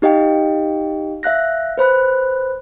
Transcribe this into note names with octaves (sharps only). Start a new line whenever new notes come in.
D#4 G4 D#5 F5 G5
E5 F5 F#6 A#6
B4 C5 B5 F#6